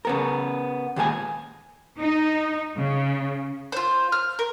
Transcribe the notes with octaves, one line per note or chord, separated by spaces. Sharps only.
C#3 B3 A#4
D#2 A#2 G#3 G#5
D#4
C#3
F4 C5
F6
A#4